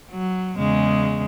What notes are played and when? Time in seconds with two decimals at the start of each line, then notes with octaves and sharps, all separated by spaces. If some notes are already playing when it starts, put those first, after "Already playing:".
0.11 F#3
0.57 E2 C#3 G#3